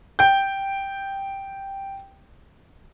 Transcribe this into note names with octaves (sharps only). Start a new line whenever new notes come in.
G5 G6